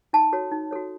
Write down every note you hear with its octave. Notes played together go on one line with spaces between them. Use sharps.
D#4 A5
F#4 A4 C#5
D#4
F#4 A4 C#5